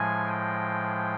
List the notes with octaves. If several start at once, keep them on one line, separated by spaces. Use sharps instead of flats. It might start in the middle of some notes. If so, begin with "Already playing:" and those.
Already playing: A2 F3 G#3 G#5
G5